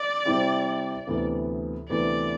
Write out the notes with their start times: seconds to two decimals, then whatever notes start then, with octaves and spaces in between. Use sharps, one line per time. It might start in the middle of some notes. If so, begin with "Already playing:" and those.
Already playing: D5
0.25 C3 G3 C4 E4 G4
1.07 D2 C3 E3 B3
1.89 D2 C3 E3 B3 D5